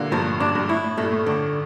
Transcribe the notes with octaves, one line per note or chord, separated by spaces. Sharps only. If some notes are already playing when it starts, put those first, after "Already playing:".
Already playing: A#2 D3 E3 G3 A#3
G2 A#2 F3
A2
G2 A#2 D4
G2
A2 E4
A2
G2 A#2 A3
A2
A2 D3